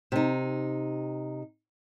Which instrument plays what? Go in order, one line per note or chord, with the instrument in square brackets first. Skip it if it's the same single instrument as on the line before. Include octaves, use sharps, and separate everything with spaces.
[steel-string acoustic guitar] C3 D#4